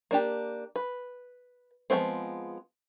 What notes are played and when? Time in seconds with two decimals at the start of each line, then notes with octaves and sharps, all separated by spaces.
0.11 A#3 D4 G4
0.76 B4
1.90 F3 F#3 G#3 B3 C4